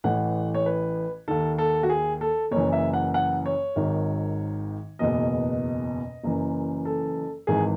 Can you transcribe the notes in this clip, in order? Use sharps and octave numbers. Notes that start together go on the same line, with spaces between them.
A1 A2 E3 F#5
C#5
B4
D#2 D#3 A4
A4
F#4
G#4
A4
F#1 F#2 E3 C#5
E5
F#5
F#5
C#5
G#1 G#2 D#3
F#1 E2 B2 D#5
F#1 F#2 E3
A4
G#1 G#2 E3 G#4